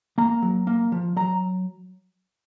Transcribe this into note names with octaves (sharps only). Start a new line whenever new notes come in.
A#3 A#5
F#3
A#3
F3
F#3 A#5